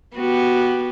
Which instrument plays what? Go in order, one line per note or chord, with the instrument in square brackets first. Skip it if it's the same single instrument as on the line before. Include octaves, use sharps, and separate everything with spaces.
[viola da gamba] B3 [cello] F#4 G4